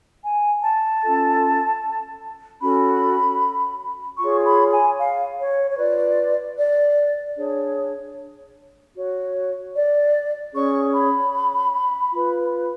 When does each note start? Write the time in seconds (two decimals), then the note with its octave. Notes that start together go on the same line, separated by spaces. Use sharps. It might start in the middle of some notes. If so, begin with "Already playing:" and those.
0.23 G#5
0.62 A5
1.02 C#4 F4 A4
2.61 C#4 F#4 A4 B5
4.19 F4 G#4 C#5 C#6
4.45 B5
4.73 G#5
4.98 F5
5.39 C#5
5.71 C#5
5.78 F4 B4 D5
6.57 D5
7.37 D4 G#4 C#5
8.95 F#4 C#5
9.74 D5
10.53 C#4 G#4 C#5 C#6
10.93 B5
12.12 F4 B4